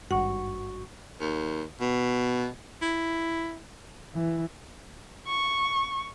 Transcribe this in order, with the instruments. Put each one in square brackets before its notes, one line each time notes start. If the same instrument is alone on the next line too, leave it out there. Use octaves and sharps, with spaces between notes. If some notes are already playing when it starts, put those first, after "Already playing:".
[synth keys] G#1 G2 [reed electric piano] F#4 C#6 [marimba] F#5
[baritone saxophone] D#2
B2
E4
[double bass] E3
[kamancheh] C#6